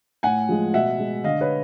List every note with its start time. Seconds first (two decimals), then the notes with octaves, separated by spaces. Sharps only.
0.23 A2 F#5 G#5
0.49 F3 G#3
0.73 B2 E5 F#5
0.99 G#3
1.24 D3 D#5 F5
1.41 B4 C#5